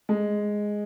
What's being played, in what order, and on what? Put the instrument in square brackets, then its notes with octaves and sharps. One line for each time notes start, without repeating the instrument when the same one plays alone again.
[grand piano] G#3